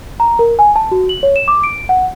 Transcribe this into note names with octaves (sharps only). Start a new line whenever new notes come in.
A#5
A#4
G#5
A5
F#4
F#7
C#5
E7
D6
D7
F#5